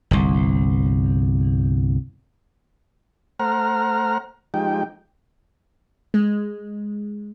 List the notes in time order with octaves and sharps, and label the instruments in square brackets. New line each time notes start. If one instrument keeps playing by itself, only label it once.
[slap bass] G1 C2
[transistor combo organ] A3 C5 F#5 A#5 F6
F3 G#3 D#4 G4 G5
[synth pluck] G#3